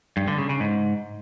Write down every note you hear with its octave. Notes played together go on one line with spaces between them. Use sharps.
G2
D3
C#3
C#3
G#2